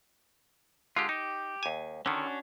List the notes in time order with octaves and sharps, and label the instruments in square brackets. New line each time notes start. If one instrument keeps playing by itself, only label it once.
[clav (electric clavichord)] D3 G#3 G4 [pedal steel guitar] F4
[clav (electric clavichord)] D#4 [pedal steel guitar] G4
[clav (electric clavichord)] D#2 G#5
[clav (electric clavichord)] D3 D#3 [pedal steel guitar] C#4 D4 F#4